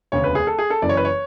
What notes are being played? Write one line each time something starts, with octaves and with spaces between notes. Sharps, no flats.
E1 D2 C#3 C#5
B4
G#4
A4
G#4
A4
F#1 F#2 E3 D5
C#5
B4
C#5